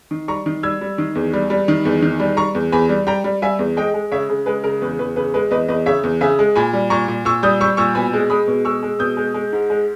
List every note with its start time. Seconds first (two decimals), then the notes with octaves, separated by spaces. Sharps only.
0.11 D#3
0.28 G3 A#5 C#6
0.46 D#3
0.63 G3 E6 G#6
0.81 G3
0.98 D#3
1.15 E2
1.33 G3
1.50 G3
1.68 D#3
1.85 E2
2.02 D#3
2.20 G3
2.37 G3 A#5 C#6
2.55 E2
2.72 E2 G#5 B5
2.89 G3
3.07 G3 G5 A#5
3.24 G3
3.42 G3 E5 G#5
3.59 E2
3.77 G#3 D#5 G5
3.94 G#3
4.12 C#3 C#5 E5
4.29 C#3
4.46 G#3 B4
4.64 C#3 A#4
4.82 E2 B4
4.99 E2 B4
5.16 C#3 B4
5.34 G#3 B4
5.51 E2 B4 D#5
5.68 E2 B4 D#5
5.86 C#3 C#5 E5
6.04 E2
6.21 C#3 E5 G#5
6.39 G#3
6.55 A#2 G#5 B5
6.73 G3
6.90 A#2 A#5 C#6
7.08 A#2
7.25 A#2 C#6 E6
7.43 G3 D#6 G6
7.61 G3 C#6 E6
7.77 A#2 C#6 E6
7.95 B2 G#5 B5
8.13 G#3
8.30 G#3 B5 D#6
8.48 B2
8.65 G#3 C#6 E6
8.83 G#3
8.99 B2 D#6 G6
9.17 G#3
9.34 G#3
9.53 G#2
9.70 G#3